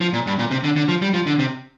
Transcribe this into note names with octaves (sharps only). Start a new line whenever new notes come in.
F3
A#2
G2
A#2
C3
D3
D3
F3
G3
F3
D3
C3